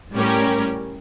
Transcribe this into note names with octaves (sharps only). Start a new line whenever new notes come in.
A2 G3 C#4 G4 A#4